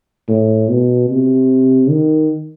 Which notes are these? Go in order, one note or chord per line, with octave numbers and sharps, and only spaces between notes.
A2
B2
C3
D#3